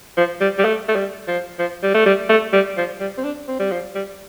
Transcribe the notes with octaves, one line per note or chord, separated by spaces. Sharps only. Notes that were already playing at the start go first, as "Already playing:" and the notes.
F3
G3
G3
A3
A3
G3
F3
F3
G3
A3
G3
A3
G3
F3
G3
C4
D4
C4
G3
F3
G3